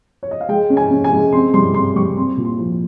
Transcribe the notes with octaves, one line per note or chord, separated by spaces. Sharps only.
C#5
D#5
F5
G#3 G5
C#4
G#5
C#4
G#5
G#3
C4 C6
G3 C6
C4 C6
G3 C#6
C4 C6
A#2
C6
F3